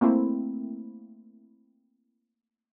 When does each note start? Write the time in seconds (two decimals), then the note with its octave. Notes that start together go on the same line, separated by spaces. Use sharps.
0.01 A3 A#3 C4 E4